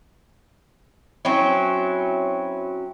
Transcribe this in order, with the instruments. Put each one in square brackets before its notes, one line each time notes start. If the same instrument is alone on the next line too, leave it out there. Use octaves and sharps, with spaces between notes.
[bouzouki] F#3 C4 C#4 E4